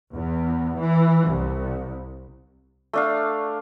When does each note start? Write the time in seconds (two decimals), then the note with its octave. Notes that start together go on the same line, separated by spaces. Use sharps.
0.15 E2
0.80 E3
1.30 C2
2.93 A3 D4 F5